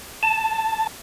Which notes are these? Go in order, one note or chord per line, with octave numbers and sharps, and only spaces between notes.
A5